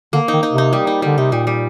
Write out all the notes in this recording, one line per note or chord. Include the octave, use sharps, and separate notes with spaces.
D3 A#3
D#4
D#3
D#4
C3
D#4
G3
D#4
D3 G3
C3 D#4
A#2 G3
G3